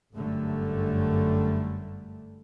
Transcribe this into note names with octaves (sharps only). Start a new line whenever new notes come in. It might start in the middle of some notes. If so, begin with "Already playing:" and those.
G1 F#2 D3 G3 A3